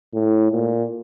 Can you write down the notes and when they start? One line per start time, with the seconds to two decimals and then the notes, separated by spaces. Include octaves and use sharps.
0.14 A2
0.52 A#2